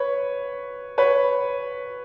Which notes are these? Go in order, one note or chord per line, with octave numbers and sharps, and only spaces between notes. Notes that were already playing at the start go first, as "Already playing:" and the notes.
Already playing: B4 C#5
B4 C#5